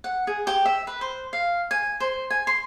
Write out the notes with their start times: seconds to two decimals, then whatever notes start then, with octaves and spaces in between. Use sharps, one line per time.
0.04 F#5
0.27 G#4
0.47 G4
0.65 E5
0.87 B4
1.01 C5
1.33 F5
1.71 G#5
2.00 C5
2.30 G#5
2.47 C6